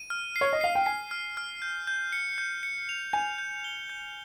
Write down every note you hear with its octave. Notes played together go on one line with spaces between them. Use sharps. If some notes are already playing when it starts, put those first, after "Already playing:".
Already playing: D#7
F6
C7
C#5
D#5
F5 C7
G5
G#5 C7
F6
F6
G6
G6
C#7
G6
C#7
F7
G#5 G6
G6
G7
G6